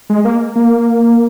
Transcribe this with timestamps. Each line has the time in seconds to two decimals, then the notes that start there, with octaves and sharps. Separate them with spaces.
0.10 G#3
0.25 A#3
0.56 A#3